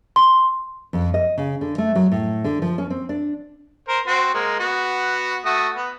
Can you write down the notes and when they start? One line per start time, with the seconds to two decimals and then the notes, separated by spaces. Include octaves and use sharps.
0.16 C6
0.93 F2
1.14 D#5
1.38 C#3
1.61 D3
1.78 A3
1.96 F#3
2.12 A2
2.44 D3
2.62 F3
2.78 C#4
2.90 C4
3.09 D4
3.88 A#4 C5
4.07 C4 F#4 C6
4.34 G#3 A#3
4.60 B3 F#4
5.45 A3 F#4 D#6
5.76 B3